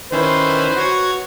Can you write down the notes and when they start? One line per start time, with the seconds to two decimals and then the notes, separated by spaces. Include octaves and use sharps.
0.12 D#3 C#4 E4 B4 C5
0.77 F#4 C#5 G#6